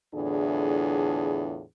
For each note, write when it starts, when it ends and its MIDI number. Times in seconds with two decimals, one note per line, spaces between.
0.15 1.63 40
0.15 1.63 45
0.15 1.63 50
0.15 1.63 62
0.15 1.63 65
0.15 1.63 68